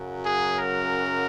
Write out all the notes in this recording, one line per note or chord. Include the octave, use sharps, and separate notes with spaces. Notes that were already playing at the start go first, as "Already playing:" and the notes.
Already playing: F#2 C#3 F#3
G#4
A#4